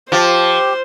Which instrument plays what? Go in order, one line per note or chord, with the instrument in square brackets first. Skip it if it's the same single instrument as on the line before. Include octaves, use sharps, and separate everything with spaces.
[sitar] F3 [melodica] G4 [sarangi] C5